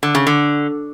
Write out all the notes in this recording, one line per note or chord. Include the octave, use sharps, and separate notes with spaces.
D3
C#3
D3